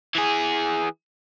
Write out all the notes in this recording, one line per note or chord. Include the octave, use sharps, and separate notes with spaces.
E3 G#4